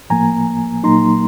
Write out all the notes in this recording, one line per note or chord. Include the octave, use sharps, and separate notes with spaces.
A2 F3 A#3 G#5 A#5
A#2 F#3 A#3 D#4 A#5 C6